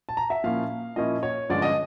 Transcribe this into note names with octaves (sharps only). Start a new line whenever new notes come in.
A5
A#5
E5
A#2 F3 A#3 C#4 E4 F5
A#2 F3 A#3 C#4 E4 D#5
C#5
G2 D3 F3 G#3 C#4 D5
D#5